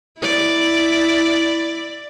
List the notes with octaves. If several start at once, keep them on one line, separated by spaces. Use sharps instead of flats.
E4 D5